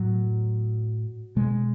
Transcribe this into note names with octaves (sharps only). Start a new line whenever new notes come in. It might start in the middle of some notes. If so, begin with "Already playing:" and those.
Already playing: A2 F#3
B2 G#3